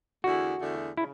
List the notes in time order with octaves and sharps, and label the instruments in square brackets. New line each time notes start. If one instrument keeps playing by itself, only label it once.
[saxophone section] E2 D3 A3 E4 G#4 [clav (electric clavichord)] F#4
[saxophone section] E2 D3 A3 E4 G#4
[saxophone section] C#3 [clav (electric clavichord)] E4